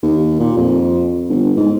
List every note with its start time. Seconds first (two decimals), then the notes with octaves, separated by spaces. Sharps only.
0.03 D#2
0.40 A#2
0.57 F2
1.29 G1
1.57 G#2